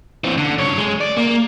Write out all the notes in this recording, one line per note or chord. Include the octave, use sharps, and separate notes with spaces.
E3 C4
D3
G2 C#5
G#3
D5
A#3